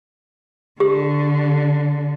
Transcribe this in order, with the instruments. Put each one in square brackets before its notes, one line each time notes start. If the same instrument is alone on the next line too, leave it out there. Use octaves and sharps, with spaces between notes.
[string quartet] D3 [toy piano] G4